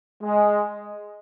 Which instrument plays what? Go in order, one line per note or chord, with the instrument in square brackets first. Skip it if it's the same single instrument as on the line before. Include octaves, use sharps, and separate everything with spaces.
[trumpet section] G#3